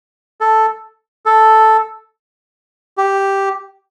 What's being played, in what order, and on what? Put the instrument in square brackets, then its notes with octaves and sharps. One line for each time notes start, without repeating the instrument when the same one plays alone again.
[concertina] A4
A4
G4